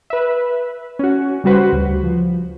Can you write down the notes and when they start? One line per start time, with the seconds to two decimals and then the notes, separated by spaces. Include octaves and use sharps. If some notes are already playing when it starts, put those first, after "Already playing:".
0.10 B4 E5
0.99 C#4 F#4
1.44 C#3 G3 F#4 B4 C5
1.72 D2
2.04 F3